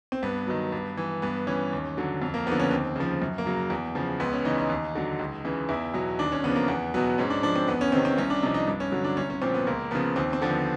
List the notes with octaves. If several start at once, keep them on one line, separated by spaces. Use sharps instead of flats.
C4
G2 B3
D#3 F#3
G2
E3
G2 B3
E3 C#4
D#2
D3 F#3
F2
A#3
D3 F3 B3
C#4
D#2 C4
C#3 F3
F#2
A#3
C#3 F#3
E2
C#3 F3
C#2 B3
C#4
C#3 E3 D#4
D#4
D#2
D3 F#3
C#2
C#3 E3
E2 E4
B2 F#3
D#2 D4
C#4
C#3 F3 B3
A#3
E2 B3
B2 F#3 B3
G#2 C#4
D4
F3 D4
C4
E2 B3
C#4
C3 D#3 C4
C4
C2 C#4
D4
C3 F3 D#4
D#4
G2
C#4
D3 F#3
D4
C2 C#4
C#4
A#2 F3 C4
B3
C#2 A#3
C#3 F3 B3
D#2 C4
C4
D3 F3
B3